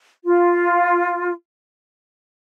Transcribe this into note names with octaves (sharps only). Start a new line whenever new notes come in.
F4